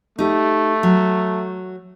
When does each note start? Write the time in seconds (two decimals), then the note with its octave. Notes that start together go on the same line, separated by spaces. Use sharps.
0.19 A3 D#4 G4
0.83 F#3